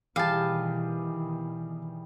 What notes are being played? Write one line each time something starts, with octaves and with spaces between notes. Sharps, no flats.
B2 D#3 E3 G3 G#4 F5 A5